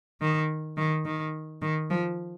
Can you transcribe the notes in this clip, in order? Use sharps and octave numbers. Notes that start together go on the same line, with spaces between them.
D#3
D#3
D#3
D#3
F3